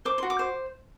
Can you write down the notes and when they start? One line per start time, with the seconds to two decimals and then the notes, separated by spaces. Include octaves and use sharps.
0.05 C5 D6
0.18 F#4 C6
0.30 D6
0.39 C5